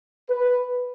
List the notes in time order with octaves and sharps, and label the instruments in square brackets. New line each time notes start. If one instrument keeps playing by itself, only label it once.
[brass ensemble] B4